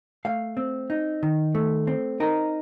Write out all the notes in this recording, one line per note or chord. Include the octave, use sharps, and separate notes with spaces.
A3 F5
C4
D#4
D#3
A3
C4
D#4 A#4